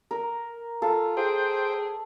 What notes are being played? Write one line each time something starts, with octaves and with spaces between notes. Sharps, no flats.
A#4
F4 A4
G#4 C5 G5